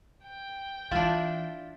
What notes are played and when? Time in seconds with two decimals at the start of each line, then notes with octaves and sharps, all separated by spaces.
0.25 G5
0.91 E3 D4 E4 F4